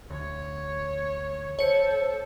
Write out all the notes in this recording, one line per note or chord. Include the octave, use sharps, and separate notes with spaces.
D2 C#5
A4 C5 C#5 C#7